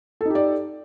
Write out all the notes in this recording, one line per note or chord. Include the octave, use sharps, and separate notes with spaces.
D#4 G4 A4 D5